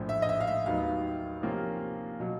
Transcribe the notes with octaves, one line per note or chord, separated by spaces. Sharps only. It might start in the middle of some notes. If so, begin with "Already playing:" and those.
Already playing: A#1 A2 F3
E5
D#5
E5
F5
E5
D#2 D#3 F#3 B3 D#4 F5
C3 F3 A#3 C#4 F4
B2 F#3